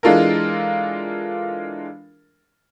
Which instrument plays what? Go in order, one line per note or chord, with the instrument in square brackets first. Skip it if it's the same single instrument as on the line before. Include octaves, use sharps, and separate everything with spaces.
[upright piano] E3 G#3 D4 F4 A4 A#4